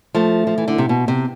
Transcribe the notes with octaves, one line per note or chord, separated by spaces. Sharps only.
F3 A3
F3
E3
D3
C3
B2
C3